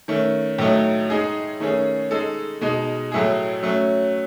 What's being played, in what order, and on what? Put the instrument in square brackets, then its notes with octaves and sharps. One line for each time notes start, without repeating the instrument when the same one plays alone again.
[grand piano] D#3 A3 C#4
A2 F#3 A3 D#4
G#3 D#4 G#4
D#3 A3 C#4 G#4
G#3 D#4 A4
B2 G#3 D#4
A2 F#3 A3 E4 G#4
F#3 A3 C#4